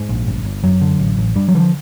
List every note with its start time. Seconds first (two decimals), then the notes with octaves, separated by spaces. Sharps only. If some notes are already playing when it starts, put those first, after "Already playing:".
Already playing: G#2
0.09 A#1
0.27 G1
0.45 G1
0.63 F#2 F#3
0.81 D3
0.99 A1
1.17 A1
1.35 G2 G3
1.48 F#3
1.55 D3 E3
1.60 F3